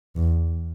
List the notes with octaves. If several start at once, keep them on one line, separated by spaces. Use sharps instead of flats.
E2